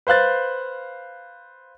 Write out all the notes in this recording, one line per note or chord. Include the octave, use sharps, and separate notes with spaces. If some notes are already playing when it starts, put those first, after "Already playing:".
B4 C5 F5 F#6 A6